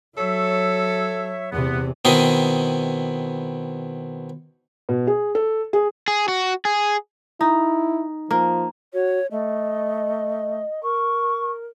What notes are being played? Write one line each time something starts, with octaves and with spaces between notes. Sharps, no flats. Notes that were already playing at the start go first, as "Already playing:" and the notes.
F#3 A4 C#5 E5
E2 C3 B3
B2 D#3 C4 E4 C6 D#6
B2
G#4
A4
G#4
G#4
F#4
G#4
D#4 E4
F3 A#3
F#4 C#5
A3 D#5
A#4 C#6